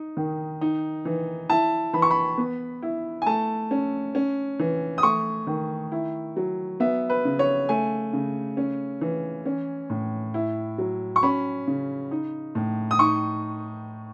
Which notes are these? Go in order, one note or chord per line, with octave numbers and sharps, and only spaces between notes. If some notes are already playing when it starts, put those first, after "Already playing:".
Already playing: D#4
D#3
D#4
E3
E4 A5
E3 B5
C#6
B5
B3
E4
G#5
A3 A5
C#4
C#4
E3
D#6
A3 C#6
D#3
E4
F#3
B3 E5
B4
C#3
C#5
A3 G#5
C#3
C#4
E3
C#4
A2
E4
F#3
C#6
C#4 B5
C#3
D#4
A2
D#6
D#4 C#6